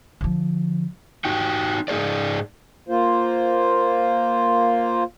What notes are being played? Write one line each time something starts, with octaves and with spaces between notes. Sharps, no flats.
D3 F3
D#4 F#4 G4 G5
G#2 D#4 G#4 C5 D5
A#3 F4 C5